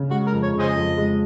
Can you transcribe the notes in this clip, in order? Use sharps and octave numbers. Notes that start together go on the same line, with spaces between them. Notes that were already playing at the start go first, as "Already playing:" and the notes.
Already playing: C#3
G#3 F#4
A#4
F2
C#5
C#3
G#4 C5 D#5
F2
G#3